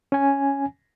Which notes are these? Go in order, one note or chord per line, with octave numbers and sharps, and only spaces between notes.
C#4 G#5